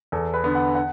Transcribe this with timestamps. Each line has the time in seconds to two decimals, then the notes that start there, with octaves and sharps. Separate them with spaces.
0.12 E2 A4
0.34 B4
0.44 D3 B3
0.55 F#5
0.75 F#5